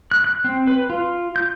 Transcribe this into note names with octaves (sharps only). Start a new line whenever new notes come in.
F#6
F#6
C4
B4
F4
G6